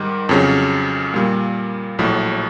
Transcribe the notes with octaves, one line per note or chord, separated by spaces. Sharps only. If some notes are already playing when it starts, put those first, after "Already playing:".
Already playing: G#2 D#3 G3
F2 C#3 F#3
A#2 G3 A#3
A#1 A2 F#3